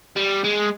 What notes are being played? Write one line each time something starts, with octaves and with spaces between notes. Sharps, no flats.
G3
G#3